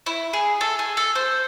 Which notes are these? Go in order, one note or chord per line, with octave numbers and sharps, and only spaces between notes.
E4
G#4
A4
G#4
A4
C5